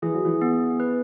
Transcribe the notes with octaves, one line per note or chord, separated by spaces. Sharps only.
E3 G#4
F#3
E3
B3
B4